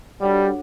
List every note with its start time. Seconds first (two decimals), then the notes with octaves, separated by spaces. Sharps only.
0.21 G3 D4 F#4 A4 C#5 F#5